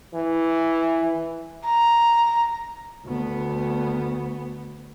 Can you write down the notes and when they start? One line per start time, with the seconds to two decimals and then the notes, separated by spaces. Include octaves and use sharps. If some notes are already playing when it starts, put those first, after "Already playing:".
0.14 E3
1.65 A#5
3.06 D2 B3